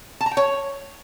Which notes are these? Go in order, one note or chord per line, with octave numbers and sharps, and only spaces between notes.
A5
A#5
G5
C#5